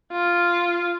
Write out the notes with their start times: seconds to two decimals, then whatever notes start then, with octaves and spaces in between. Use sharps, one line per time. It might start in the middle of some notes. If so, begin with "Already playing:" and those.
0.12 F4